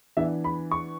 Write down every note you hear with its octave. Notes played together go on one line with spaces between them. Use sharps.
E3 B3 D4 E5
B5
C#6